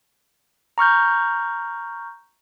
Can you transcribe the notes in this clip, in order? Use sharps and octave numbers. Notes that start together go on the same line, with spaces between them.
A#5 C#6 F6 G6